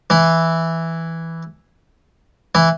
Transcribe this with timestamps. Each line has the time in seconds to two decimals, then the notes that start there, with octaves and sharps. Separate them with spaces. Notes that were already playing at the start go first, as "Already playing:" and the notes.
0.10 E3 E4
2.55 E3 E4